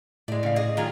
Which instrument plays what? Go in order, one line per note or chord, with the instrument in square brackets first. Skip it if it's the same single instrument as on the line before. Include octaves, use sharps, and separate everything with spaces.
[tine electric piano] A2 [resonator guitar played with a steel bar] G#3 A3 [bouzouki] D5
[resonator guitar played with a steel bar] C#3 F5
[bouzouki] G#4 [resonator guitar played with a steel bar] D#5
[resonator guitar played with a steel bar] D#3 F4 G#4 [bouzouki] F#3 A#5